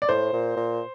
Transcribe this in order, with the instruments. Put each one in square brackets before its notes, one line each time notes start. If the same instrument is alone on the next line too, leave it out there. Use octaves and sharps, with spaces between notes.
[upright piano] D5
[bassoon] A2 [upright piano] C5
[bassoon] A#2
A#2